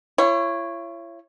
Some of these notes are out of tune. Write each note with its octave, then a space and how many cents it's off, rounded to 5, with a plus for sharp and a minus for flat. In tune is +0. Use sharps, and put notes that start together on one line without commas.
E4 +45 C#5 -10